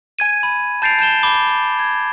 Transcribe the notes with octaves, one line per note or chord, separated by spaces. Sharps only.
G#5 G#6 D#7
B5
A5 G6 A6 C7 D7 F7
A5 G6 E7 G7
B5 D6 G7
G#6